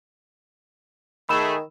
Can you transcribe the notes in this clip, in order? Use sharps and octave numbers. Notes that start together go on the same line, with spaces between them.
D#3 A3 G#4 B5 E6 E7